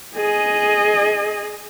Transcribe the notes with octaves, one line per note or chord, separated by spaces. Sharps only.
G#4 D#5